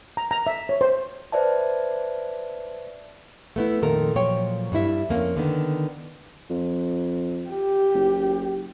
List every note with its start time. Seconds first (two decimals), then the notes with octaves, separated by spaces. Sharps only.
0.17 A#5
0.31 A#5
0.47 E5
0.69 C#5
0.81 C5
1.32 B4 C5 D5 E5 A5
3.56 A3 B3 E4
3.82 F2 A#2 D#3 A4 A#4
4.15 A#2 F3 F#3 C#5 G5
4.72 G2 G3 E4 E5
5.09 F2 A#3 C4 C#4
5.36 D3 D#3 B3
6.50 F2
7.50 G4
7.94 F#1